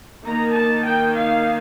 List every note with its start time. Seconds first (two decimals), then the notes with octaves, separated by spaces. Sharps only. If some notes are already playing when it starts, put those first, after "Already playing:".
0.23 D#3 A#3 D#4 A#5
0.54 A5
0.84 G5
1.15 F5